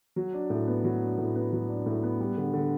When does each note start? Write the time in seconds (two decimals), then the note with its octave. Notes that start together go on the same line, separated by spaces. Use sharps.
0.16 F#3
0.33 D4
0.50 A2
0.67 B3
0.84 F#3
1.01 D4
1.18 A2
1.36 B3
1.52 F#3
1.69 D4
1.86 A2
2.03 B3
2.20 G3
2.37 D3
2.53 D3